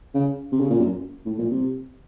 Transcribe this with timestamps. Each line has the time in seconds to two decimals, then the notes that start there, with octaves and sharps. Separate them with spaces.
0.14 C#3
0.52 C3
0.60 C#3
0.70 A#2
0.79 F#2
1.26 A2
1.38 A#2
1.51 C3